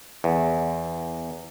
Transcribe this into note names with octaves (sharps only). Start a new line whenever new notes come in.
E2